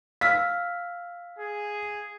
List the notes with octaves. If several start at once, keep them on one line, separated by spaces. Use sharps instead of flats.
F5 E6 F6 B6
G#4